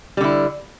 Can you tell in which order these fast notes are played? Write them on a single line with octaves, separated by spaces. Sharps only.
G3 D3 E4